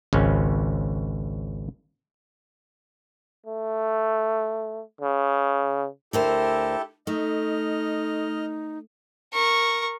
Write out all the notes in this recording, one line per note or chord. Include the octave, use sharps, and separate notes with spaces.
G#1 C#2 C#4
A3
C#3
D2 E4 G4 A4 A#4 C5
A3 D#4 D#5 F6
A#4 C#6